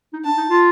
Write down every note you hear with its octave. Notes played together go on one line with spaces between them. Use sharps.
D#4
D4 A5
D#4
F4